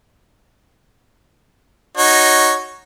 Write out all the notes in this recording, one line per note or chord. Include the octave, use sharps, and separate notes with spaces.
D#4 F#4 C#5